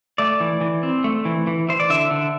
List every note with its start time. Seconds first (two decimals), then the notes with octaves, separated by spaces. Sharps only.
0.18 A3 D5
0.40 E3
0.61 E3
0.83 C4
1.04 A3
1.25 E3
1.47 E3
1.69 E3 C5
1.80 D5
1.90 D3 E5
2.11 D3